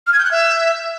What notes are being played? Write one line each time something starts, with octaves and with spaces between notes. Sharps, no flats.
F6
G#6
G6
F#6
E5